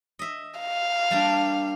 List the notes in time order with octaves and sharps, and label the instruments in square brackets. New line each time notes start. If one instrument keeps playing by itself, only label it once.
[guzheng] D#5 E5
[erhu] F5
[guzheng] G3 A#3 D4